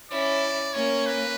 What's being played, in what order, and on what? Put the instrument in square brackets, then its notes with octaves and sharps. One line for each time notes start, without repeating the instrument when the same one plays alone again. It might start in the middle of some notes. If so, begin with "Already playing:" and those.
[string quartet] C#4 E4 [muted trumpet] D5
[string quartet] A#3 C#4 [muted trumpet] C#5
[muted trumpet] B4